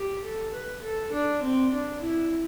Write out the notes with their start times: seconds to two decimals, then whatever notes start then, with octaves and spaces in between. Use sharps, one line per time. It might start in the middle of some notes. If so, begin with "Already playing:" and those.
Already playing: G4
0.23 A4
0.53 B4
0.83 A4
1.12 D4
1.42 C4
1.72 D4
2.02 E4